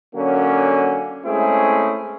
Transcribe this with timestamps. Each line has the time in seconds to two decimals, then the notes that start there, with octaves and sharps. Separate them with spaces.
0.16 D3 F#3 A#3 C#4
1.26 G#3 A3 C4 C#4 E4 G#4